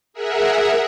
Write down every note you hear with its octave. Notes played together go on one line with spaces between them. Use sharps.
G#4 A#4 E5 F#5